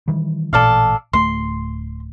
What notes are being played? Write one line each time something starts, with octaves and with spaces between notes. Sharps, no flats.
D#3 E3 G3
A1 A#2 A4 D5 F5
D1 A3 C6